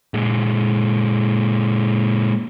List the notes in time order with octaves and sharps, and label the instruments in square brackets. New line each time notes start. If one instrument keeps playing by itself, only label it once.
[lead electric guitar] A#2 G#3